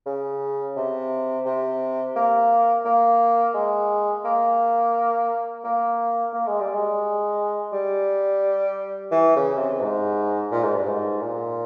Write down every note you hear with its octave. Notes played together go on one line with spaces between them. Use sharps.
C#3
C3
C3
A#3
A#3
G#3
A#3
A#3
A#3
G#3
G3
G#3
G3
E3
C#3
C3
G#2
A#2
G#2
G2
G#2
A#2